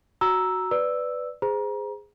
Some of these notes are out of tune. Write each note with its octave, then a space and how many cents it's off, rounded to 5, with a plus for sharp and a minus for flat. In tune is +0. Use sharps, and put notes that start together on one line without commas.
F#4 +0 A#5 +0 E6 +0
B4 +10 D5 +0 E6 +0
G#4 -10 C5 -25 A#5 +30